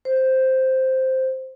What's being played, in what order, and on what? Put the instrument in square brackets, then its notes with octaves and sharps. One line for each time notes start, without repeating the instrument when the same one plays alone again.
[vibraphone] C5